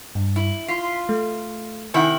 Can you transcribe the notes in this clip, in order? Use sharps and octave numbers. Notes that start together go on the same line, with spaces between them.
G2
E4
F4 B6 C7
A3
C3 D#3 E4 F#5 G#5